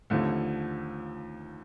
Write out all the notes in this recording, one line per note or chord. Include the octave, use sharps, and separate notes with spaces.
D#2 D3 F3 A3